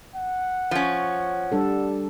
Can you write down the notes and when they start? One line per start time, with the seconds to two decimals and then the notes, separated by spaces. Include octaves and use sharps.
0.16 F#5
0.71 F3 C#4
1.52 G3 D4 A4